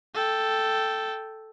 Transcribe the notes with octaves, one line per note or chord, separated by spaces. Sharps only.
A4 G5